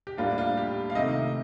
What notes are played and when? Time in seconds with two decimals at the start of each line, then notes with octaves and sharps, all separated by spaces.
0.07 G4
0.17 A2 G3 A#3 D4 F4
0.38 F4
0.57 G4
0.90 F5
0.95 C3 D#3 A3 D#5